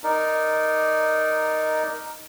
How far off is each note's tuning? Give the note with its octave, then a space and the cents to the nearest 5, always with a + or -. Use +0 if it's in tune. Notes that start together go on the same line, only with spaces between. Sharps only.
D#4 +0 A#4 +0 D5 +0